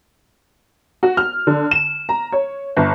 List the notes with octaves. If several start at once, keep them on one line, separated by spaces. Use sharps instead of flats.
F#4
F6
D3
E7
A#5
C#5
G1